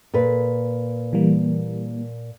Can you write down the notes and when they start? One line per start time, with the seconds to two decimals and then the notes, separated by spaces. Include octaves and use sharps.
0.14 A#2 B4
1.13 E3 G3 A#3